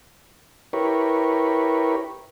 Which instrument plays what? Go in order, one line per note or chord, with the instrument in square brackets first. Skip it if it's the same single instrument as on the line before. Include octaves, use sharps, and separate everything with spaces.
[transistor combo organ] E4 G4 A#4 B4 C#5